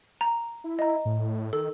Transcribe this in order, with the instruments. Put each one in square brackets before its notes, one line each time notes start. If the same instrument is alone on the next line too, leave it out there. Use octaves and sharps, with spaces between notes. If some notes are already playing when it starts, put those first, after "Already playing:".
[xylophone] A#5
[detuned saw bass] E4
[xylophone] D#5 A#5
[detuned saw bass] A2
[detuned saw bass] D#3 [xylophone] A4